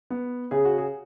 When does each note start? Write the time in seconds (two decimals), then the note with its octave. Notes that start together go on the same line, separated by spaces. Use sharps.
0.10 B3
0.51 C#3 G#4
0.65 F#4
0.78 G#4